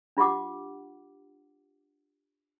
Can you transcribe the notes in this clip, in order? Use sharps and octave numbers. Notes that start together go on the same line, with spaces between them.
D4 F4 G4 F#5 D6